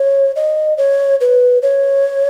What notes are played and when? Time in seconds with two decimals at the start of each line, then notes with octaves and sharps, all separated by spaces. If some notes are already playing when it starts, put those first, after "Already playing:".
Already playing: C#5
0.36 D#5
0.78 C#5
1.21 B4
1.62 C#5